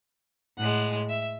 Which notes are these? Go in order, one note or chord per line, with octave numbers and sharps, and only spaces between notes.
A2 G#3 F#5
E5